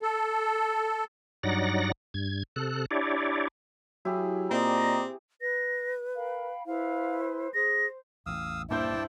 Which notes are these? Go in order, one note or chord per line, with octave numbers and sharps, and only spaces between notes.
A4
G2 F#3 D#4 D5 F#5 A#6
G2 G#6
C3 A4 F#6
D4 E4 G4 C#5 D5
F#3 E4 G4 G#4
A#2 C4 D5 D#5 A#5
B4 A#6
A#4 F5 G5 B5
E4 G#4 B4 C5 F5
G#4 C5 A#6
A1 E2 F5 D#6 E6
G2 A#3 E4 C5 D5 G5 A5 G6